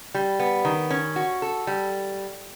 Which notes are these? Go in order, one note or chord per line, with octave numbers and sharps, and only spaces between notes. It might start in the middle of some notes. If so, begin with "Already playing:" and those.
G3
B3
D#3
C#4
F#4
A4
G3